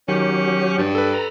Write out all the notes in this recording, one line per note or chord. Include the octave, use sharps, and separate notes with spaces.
D#3 F#3 C#4 G4
G2
A4 B4
A#5